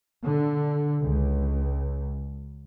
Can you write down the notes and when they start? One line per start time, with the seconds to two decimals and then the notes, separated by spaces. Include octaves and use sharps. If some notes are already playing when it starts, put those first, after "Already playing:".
0.23 D3
1.01 C#2